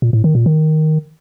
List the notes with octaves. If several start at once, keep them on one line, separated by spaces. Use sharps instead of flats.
A#2
A2
D#3
A#2
D#3